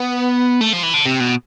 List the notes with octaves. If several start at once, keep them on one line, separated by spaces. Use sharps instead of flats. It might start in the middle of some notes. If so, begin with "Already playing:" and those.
Already playing: B3
A3
F3
E3
D3
C3
B2